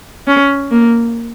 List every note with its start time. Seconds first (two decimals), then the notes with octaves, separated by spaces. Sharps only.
0.27 C#4
0.71 A#3